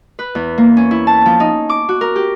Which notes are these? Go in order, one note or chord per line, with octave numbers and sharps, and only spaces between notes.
B4
E2
A#3
C#4
E4
A5
F3
D#4
D6
F#4
A#4
G4